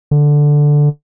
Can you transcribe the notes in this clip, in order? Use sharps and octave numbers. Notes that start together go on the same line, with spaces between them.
D3